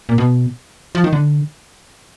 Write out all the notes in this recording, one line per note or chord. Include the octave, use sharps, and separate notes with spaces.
A#2
B2
F3
D#3
D3